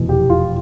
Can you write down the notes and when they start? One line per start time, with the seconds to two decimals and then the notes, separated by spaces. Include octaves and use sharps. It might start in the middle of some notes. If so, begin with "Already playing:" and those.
Already playing: F1 E2 B2
0.09 G4
0.30 F4